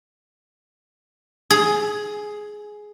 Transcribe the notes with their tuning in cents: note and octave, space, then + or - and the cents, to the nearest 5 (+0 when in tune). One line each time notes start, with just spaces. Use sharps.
G#4 +10